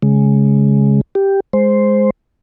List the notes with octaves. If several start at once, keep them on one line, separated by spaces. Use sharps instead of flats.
C#3 G#3
G4
G#3 C5